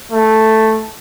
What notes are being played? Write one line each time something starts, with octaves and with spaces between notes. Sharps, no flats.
A3